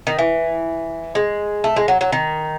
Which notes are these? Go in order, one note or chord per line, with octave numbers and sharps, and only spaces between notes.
D#3
E3
G#3
A3
G#3
F#3
F#3
D#3